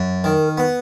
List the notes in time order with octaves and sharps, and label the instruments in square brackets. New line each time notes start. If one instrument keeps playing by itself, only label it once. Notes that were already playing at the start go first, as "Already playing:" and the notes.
Already playing: [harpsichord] F#2
[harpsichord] D#3 [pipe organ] A#4
[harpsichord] B3